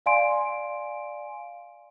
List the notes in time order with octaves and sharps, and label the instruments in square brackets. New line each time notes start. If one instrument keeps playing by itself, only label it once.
[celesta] D5 F5 G#5 C6 D7